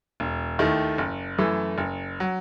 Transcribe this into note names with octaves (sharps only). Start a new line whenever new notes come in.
E1
D#2 D#3 A3 E4
F#1
F#2 E3 A3
F#1
F#3